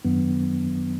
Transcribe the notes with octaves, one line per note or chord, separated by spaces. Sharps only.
F#2 D#3 F#3 B3 D4